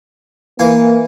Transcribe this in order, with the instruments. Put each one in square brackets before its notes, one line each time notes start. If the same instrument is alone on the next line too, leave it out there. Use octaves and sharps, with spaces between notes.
[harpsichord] E3 F5 G#5 [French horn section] A#3